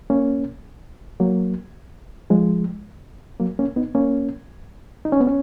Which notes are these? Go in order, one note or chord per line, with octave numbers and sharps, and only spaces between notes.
A#3 C#4
F#3 A#3
F3 G#3
F#3 A#3
A#3 C#4
B3 D#4
A#3 C#4
D#4
C#4
B3
C#4